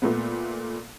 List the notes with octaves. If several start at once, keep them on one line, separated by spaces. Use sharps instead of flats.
A#2 A3 B3